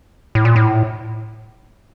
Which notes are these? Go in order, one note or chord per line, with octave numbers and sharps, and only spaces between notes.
A2
A#2
A2